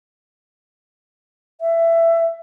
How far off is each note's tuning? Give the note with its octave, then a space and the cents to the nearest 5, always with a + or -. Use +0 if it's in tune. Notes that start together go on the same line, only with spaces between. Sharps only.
E5 +15